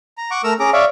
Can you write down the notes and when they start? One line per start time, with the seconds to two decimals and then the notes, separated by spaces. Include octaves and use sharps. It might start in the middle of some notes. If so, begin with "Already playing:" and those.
0.18 A#5
0.31 F#5 C#6 D6
0.44 A3 A#4 A#5 E6
0.60 C#4 G#4 A#5 D6
0.73 C#5 D5 E5 F5